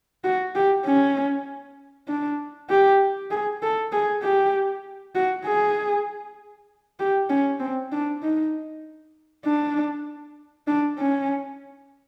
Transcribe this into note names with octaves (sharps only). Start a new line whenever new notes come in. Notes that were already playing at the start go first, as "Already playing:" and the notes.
F#4
G4
C#4
D4
G4
G#4
A4
G#4
G4
F#4
G#4
G4
C#4
C4
D4
D#4
D4
D4
C#4